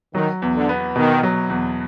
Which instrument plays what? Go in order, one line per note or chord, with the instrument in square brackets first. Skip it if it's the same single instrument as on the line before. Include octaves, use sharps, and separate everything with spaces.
[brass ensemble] D#3 [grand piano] F#3
[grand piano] E2
[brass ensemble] D3
[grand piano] B3
[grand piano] B2 [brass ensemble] D#3
[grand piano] F#3
E2